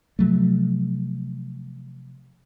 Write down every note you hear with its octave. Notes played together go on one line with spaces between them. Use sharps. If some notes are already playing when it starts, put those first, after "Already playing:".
C3 F3 F#3 A3